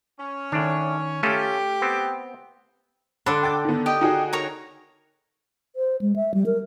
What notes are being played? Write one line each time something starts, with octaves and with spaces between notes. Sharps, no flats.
C#4
A2 D#3 D4
A3 C#4 F4 G4 A4
B3 C4
D3 D4 B5 C6 E6 F#6
G5 D6 A6
D#3 B3
G4 D#5 G5
D#4 F#4 G#4
A#4 C#5 A#5
C5
G#3
E5
G3
A#4